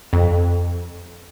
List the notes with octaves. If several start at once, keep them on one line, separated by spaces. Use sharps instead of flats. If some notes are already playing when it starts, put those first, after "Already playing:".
F2